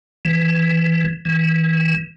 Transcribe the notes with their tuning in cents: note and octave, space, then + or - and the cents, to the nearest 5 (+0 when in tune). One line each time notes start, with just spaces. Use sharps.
E3 +10
E3 -25